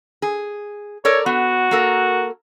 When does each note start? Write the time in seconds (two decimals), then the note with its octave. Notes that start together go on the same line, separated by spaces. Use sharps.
0.22 G#4
1.05 A4 A#4 C#5 D5
1.26 B3 F#4
1.71 A#3 A4 A#4